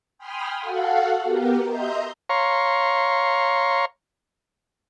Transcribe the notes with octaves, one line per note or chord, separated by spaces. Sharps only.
G5 G#5 B5 C6 D#6 F6
F#4 A4 F5 F#5
B3 G4 A#4
D#5 E5 A#5 C6 G6
C#5 F5 A#5 C6 C#6